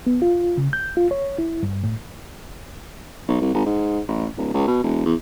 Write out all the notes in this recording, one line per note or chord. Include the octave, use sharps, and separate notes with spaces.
B3
F4
C#3
G6
F4
C#5
E4
G2
A2
B1
C2
G#1
G#2
A1
D1
C#2
B2
E1
E2